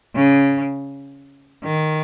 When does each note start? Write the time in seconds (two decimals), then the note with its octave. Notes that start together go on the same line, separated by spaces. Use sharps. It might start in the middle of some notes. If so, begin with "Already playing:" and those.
0.16 C#3
1.64 D#3